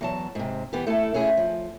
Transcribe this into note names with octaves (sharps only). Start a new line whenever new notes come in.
E2 F#3 A5
G#2 C3
E3 B3 G4
A3 E4 F#4 A4
C#4 E4 G#4
F3